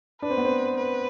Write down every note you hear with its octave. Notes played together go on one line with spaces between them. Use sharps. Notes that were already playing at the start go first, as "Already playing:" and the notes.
D4 B4
C4
B3
C4
B4